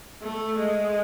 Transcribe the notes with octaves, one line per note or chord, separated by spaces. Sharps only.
A3
G#3